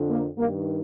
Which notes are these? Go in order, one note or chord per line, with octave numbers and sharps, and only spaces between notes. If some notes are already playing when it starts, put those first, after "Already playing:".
Already playing: F2 D3
A#3
G2 D#3 A#3